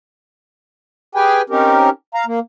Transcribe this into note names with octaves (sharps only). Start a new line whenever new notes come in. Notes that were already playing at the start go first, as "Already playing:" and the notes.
G4 G#4 B4 G5 G#5
C4 C#4 D#4 G4 A#4
F5 A#5
A#3